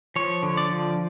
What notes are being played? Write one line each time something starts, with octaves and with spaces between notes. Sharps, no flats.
F3 C#5
D3
D5
F3